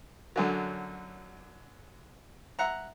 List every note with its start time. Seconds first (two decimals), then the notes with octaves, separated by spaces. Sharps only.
0.36 F#2 D3 F#3
2.59 E5 F#5 A#5